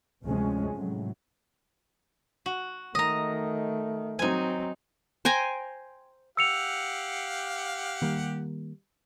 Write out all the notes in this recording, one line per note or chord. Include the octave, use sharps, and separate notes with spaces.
D2 C3 F3 G#3 C#4
A2 C3 F#3
F#4
D#3 A3 D#5 A#5
F#3 C4 D#4 G#5
C5 G5 G#5 A#5
G4 F5 F#5 E6 C#7 F7
D#3 G3 A#3